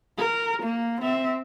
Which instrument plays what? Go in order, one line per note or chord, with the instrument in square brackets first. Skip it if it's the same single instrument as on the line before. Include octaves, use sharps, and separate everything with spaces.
[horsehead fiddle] A#4
A#3
C4 E5